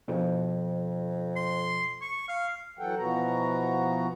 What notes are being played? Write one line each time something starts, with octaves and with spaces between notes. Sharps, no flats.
F2 B2 F3
C6
C#6
F5
E3 F#3 A4 F#5 G5
B2 E3 F3 B3 F#4 A#5